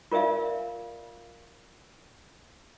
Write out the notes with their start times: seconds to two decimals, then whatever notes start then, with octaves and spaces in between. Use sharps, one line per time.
0.12 F4 A#4 D5 E5 F5